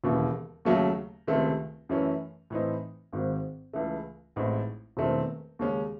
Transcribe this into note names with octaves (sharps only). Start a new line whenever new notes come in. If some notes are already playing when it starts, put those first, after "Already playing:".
E1 D#2 C#3 E3
D#2 C#3 F#3 A3 C#4
C#2 C3 D#3 A3 C4
F#2 E3 A3 C#4 E4
A2 E3 C4 D#4
G#1 G#2 D#3
C#2 C#3 E3 A3
A1 A2 G#3 C4 D#4
E1 E2 D#3 A3 C4
D#2 C#3 G#3 C#4